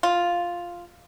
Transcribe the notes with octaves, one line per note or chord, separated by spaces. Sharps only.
F4